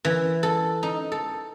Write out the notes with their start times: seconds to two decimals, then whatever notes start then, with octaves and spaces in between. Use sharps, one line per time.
0.05 E3
0.43 A4
0.83 D#4
1.12 A4